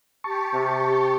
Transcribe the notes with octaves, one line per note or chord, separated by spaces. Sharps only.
G4 A5 C#6
C3